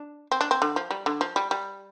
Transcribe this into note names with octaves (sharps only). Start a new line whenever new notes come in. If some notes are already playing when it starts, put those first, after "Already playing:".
Already playing: D4
C4
D4
C4
D3
F3
G3
D3
F3
G3
G3